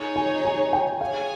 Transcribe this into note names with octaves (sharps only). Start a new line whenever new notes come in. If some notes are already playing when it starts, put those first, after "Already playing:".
Already playing: D#4 G#4 C#5
G#5
G#5
G5
G#4 C#5 F5 G#5